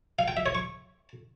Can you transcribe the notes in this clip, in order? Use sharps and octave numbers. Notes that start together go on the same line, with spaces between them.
F5
G5
E5
C#5
C#6